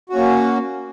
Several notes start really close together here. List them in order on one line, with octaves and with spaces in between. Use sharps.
F#4 C#4 A#3